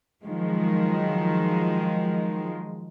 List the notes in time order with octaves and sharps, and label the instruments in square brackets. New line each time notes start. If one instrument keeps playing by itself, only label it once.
[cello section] D#3 F3 F#3 G#3